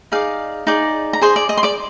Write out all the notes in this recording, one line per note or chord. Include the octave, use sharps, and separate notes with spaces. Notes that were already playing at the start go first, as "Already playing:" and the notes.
D#4 G#4 D5 F5
D#4 G#4 D5
A#5
G#4 C5 D#5 C6
D5 D6
D#5 D#6
C6
D5 D6